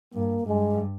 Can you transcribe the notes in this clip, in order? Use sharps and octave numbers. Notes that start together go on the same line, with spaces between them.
G2 A#3
G2 G#3